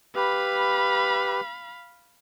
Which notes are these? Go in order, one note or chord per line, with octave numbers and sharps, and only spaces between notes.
G4 B4 F5 B5